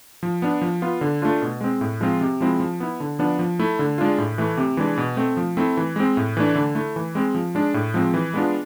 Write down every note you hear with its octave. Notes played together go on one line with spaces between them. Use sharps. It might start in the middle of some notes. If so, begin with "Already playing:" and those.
F3
B3 D4
F3
B3 F4
D3
A3 D4 F4
B2
G#3 C4
A2
F3 G#3 C4 F4
C3
F3 G#3 C4 E4
F3
B3 E4
D3
F3 B3 D4
F3
A3 E4
D3
G#3 D4 F4
A2
E3 A3 E4
C3
E3 G#3 D4
B2
A3 C4
F3
A3 C4 E4
E3
G#3 C4
A2
E3 A3 D4
D3
A3 E4
E3
G#3 C4
F3
G#3 D4
A2
F3 G#3 C4
E3
G#3 B3 D4 F4